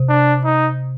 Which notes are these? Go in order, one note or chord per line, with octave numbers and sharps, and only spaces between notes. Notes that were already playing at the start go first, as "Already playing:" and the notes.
Already playing: C3
D4
D#4